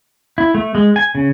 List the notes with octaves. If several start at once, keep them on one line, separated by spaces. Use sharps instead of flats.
E4
A3
G#3
G#5
C#3